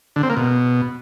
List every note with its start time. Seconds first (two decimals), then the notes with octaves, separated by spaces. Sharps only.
0.16 D3
0.23 C4
0.30 A#3
0.37 B2